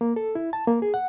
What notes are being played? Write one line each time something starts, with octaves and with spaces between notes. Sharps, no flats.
A#3
A4
E4
A5
A#3
G#4
F#5